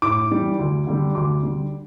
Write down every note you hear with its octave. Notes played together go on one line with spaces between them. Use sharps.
A2 D6
E3 G3
D2
D3 G3
D2 D6
D3 G3